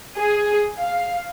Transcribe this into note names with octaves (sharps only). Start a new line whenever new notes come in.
G#4
F5